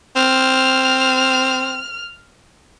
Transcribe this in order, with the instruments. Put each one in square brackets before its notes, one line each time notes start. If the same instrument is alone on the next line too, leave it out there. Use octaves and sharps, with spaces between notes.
[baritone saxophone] C4 [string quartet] F6